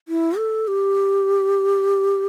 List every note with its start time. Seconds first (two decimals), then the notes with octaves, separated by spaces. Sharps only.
0.08 E4
0.37 A4
0.68 G4